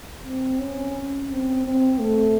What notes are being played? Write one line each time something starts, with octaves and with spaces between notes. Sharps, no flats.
C4
C#4
C4
C4
A3